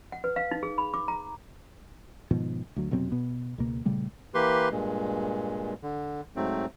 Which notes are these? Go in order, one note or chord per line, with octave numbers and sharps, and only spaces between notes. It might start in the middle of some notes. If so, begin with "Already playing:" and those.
F#5
B4
F5
D#4
G#4
B5
D6
A#5
G#2 B2 D#3 F3
D2 F#3
F1 B2 F#3 C4
B2 B3
C#2 B2 A#3
A#2 C#3 G3 A3
E3 A#3 G4 B4 C6
G2 A#2 G#3
D3
G#2 F#3 A3 C4